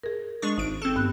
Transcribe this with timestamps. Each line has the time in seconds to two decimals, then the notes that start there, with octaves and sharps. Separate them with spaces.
0.04 G#4 A#4
0.42 G#3 D4 C#6
0.58 G#1 D#4 D7
0.82 C4 A4
0.96 G2 B3 F#6